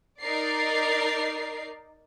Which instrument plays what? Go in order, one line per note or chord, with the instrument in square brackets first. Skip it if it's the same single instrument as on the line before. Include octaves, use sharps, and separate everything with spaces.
[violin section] D#4 A#4 D5 C7